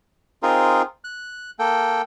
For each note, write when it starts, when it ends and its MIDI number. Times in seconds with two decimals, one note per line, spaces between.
0.43 0.82 60
0.43 0.82 63
0.43 0.82 65
0.43 0.82 68
0.43 0.82 70
1.04 1.51 90
1.59 2.02 58
1.59 2.02 69
1.59 2.02 79